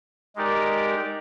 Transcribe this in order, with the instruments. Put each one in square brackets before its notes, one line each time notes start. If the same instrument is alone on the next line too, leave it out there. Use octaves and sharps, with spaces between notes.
[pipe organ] G#3 D#4 G4 A#4 D5